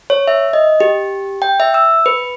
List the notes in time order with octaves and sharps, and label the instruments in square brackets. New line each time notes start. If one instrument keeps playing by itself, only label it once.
[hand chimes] C#5
E5
D#5
G4
G5
E5
E6
B4